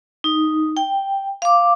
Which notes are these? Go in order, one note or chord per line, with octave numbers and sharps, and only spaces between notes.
D#4
G5
F5 D6